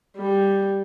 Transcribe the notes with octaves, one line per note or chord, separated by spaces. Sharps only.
G3